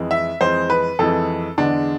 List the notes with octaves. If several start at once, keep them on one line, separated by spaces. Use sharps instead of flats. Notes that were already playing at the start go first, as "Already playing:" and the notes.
Already playing: F2 E3 G#3
E5
F2 E3 G#3 C5
B4
F2 E3 G#3 A4
E2 D3 G#3 D4